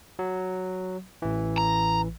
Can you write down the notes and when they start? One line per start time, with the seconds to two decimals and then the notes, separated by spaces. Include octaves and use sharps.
0.19 F#3
1.22 A1 E3
1.58 A#5